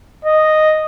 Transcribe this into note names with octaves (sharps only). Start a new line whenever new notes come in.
D#5